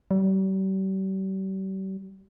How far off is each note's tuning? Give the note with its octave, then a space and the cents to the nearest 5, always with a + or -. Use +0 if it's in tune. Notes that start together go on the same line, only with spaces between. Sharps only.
G3 -40